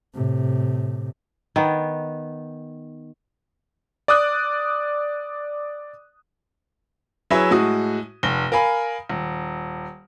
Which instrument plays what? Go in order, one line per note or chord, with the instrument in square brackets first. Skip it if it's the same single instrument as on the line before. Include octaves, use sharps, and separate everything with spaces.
[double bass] A2 C3
[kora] D#3 B3
[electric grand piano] D5 D6 D#6 F#6
[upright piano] F#3 E4 G#4 B4 C#5 E5
A2 G#3 F#4 D#6
F1 G7
A#4 F5 G#5 B5
D#1